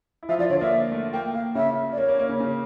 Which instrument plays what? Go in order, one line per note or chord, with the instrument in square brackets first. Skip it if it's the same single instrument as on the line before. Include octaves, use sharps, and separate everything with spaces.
[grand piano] E4
[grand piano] F3 F4 [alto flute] E5
[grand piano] F3 F4 [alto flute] D5
[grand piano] D3 D4 [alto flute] C#5
[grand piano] A#3 [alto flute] E5
[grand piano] A3
[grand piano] A#3 [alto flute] G5
[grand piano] A#3 [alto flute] F5
[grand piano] C#3 C#4 [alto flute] E5
[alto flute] D5
[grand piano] A#3 [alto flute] C#5
[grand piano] A#3
C#4
A#3
C#3 C#4
C#3 C#4